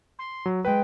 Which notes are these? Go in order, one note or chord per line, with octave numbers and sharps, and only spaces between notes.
C6
F#3
G#3 B4 G5